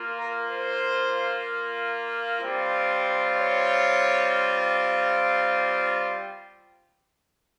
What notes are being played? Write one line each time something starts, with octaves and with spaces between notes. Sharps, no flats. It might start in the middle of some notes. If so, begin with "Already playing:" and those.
Already playing: A#3 F4
A#4
C5
G3 C4 F4
C#5